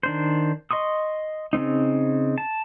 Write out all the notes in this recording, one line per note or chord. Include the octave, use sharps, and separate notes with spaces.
D#3 D4 C5
D#5 C6 C#6 D#6
C#3 G3 C4 D#4
A5